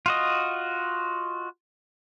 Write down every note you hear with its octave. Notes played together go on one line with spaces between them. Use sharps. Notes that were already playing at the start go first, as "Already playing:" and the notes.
F4 F#4 D#5